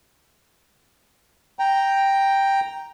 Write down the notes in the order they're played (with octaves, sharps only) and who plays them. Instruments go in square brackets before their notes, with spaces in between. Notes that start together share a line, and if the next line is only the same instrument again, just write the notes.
[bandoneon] G5 A#5